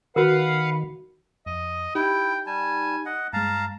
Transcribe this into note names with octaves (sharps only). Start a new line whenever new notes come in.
D#3 F#4 A#4 B4 F5 F#5
F2 D#5
D#4 E4 G4 G5
G3 G#5 A5
D#5 F#5
G2 G#3 F5 A5 A#5